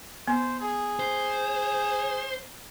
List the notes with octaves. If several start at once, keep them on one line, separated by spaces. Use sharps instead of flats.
B3 C5
G#4
C5